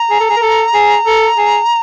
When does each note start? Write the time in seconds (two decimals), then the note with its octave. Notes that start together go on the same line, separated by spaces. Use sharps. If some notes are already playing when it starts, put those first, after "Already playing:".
Already playing: A#5
0.10 G#4
0.20 A4
0.30 G#4
0.36 A#4
0.42 A4
0.74 G#4
1.06 A4
1.37 G#4